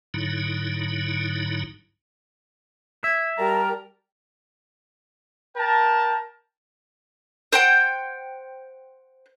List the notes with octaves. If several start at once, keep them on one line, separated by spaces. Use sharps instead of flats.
G#2 D3 F#3 D#4 E4
E5 G#6
G3 G4 A#4 A5 A#5
A#4 G5 A5
C5 F#5 G5